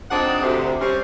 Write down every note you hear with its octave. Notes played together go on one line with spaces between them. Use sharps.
F3 C4 D4 D#4 G#4 F#5
D2 C3
G3 C4 C#4